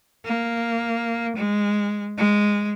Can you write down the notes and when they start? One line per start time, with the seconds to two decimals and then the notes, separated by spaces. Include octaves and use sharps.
0.24 A#3
1.36 G#3
2.18 G#3